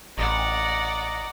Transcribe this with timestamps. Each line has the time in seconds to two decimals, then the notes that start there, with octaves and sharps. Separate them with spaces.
0.18 A1 D5 D#5 F#5 A#5